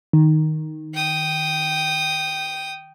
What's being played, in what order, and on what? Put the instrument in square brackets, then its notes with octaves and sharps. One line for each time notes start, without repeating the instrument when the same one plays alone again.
[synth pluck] D#3
[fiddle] G5 D#6